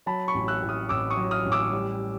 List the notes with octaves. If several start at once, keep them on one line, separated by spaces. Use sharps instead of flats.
F#3 A5 B5
B5 C#6
A1
E6 F#6
A2
D#6 F6
A1 D6 E6
C#6 D#6
F#3
D#6 F6
A1
D6 E6
G3